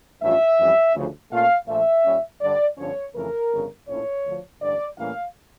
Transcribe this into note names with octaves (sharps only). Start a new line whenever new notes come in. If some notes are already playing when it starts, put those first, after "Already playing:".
A1 G2 F3 C#4 F4 E5
F2 E3 G3 C#4
D2 C#3 F3
A#2 A3 C#4 F4 F5
A#1 A#2 F3 A3 E5
A#2 G3 C#4
G2 D3 G3 D4 D5
G1 G2 D3 F3 C#4 C#5
F2 C#3 E3 A3 A#4
G1 F2 C#3
A#1 A2 F3 C#4 E4 C#5
D2 D3 F3
A1 G2 D3 D5
A2 E3 G3 A#3 C#4 F5